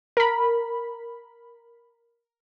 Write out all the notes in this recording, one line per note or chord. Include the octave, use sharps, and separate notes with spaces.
A#4 B5